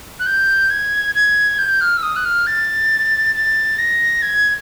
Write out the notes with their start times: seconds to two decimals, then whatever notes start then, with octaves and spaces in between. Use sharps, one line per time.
0.20 F#6
0.26 G6
0.70 G#6
1.15 G#6
1.58 G6
1.81 F6
1.97 E6
2.03 D#6
2.16 F#6
2.25 F6
2.47 A6
3.35 A6
3.78 A#6
4.22 G#6